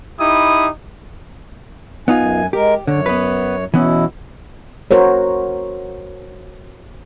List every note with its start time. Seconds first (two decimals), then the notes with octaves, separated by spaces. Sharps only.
0.20 D#4 E4 G4 B5 D#6
2.08 F#2 B3 D#4 F4 G#5
2.53 G#3 G4 A#4
2.87 F#2 D3 C#5
3.06 B3 B4
3.74 B2 E3 B3 C#4 E4
4.91 F#4 A#4 C5 C#5